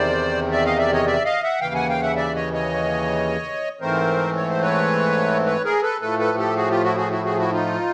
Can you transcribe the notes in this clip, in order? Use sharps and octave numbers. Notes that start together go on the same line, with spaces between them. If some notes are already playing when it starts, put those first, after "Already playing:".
Already playing: E2 C3 D#3 C5 D5
D5 E5
D#5 F5
D5 E5
C#5 D#5
D5 E5
D#5 F5
E5 F#5
D#2 C#3 E3 F5 G5
F#5 G#5
F5 G5
E5 F#5
D5 E5
C#5 D#5
C#5 D#5
G#2 E3 A3 C4 A#4 C5
C#5
C5
B4 C#5
B4 C#5
G#4 A#4
A4 B4
A2 F3 A3 A4 B4
A4 B4
G4 A4
F#4 G#4
F4 G4
E4 F#4
F#4 G#4
E4 F#4
F#4 G#4
E4 F#4
D#4 F4